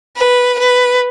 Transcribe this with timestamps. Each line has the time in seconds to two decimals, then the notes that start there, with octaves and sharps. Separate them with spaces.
0.17 B4
0.59 B4